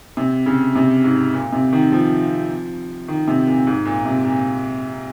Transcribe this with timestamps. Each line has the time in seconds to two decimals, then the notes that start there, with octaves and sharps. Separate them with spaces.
0.17 C3
0.46 C#3
0.75 C3
1.04 G#2
1.34 A#2
1.53 C3
1.73 D#3
1.92 F3
3.08 D#3
3.28 C3
3.47 A#2
3.67 G#2
3.86 A#2
4.06 C3
4.24 A#2